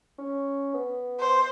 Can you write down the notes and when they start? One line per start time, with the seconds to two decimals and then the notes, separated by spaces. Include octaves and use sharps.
0.18 C#4
0.74 B3
1.20 C5